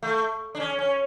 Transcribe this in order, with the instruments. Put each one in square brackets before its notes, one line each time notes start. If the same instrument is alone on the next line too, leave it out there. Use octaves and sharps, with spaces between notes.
[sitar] A3
D4
C#4
C#4